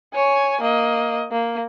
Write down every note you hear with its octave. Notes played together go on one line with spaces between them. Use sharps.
C#5 G#5
A#3 D#5
A#3